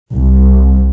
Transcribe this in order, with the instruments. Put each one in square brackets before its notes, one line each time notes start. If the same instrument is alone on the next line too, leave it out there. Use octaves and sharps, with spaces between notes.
[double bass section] C2